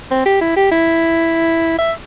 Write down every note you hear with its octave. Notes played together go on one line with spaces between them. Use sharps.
C4
G4
E4
G4
E4
E5